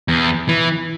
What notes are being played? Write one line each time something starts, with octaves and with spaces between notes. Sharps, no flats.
E2
E3